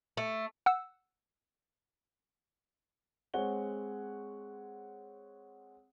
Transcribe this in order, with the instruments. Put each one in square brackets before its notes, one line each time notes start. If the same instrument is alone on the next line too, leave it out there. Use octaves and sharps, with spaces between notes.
[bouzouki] A3
[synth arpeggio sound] F#5 E6
[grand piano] G#3 C4 C#5 F#5 G7